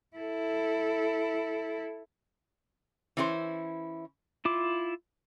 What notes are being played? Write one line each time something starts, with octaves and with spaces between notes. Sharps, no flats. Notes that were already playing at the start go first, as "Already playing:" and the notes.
E4 A4
E3 C#4 E4 G4 C5
E4 F4 D6